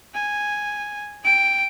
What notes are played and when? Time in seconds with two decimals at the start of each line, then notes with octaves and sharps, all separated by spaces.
0.14 G#5
1.24 G5 D7